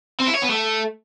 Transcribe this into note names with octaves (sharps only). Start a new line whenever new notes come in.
C4
E4
C#5
B3
A3